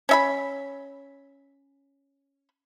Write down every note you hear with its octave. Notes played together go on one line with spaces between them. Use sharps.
C#4 E5 B5